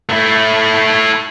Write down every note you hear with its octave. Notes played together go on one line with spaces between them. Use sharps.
A3 E4